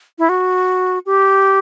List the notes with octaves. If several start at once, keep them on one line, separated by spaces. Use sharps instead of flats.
E4
F#4
G4